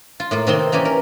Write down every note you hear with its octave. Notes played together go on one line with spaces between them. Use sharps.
F4
A2 A#3 F4
C3 D#3 A#3 C4 D#4 C6
E3 A#3 C#4 G4 G#5
A#4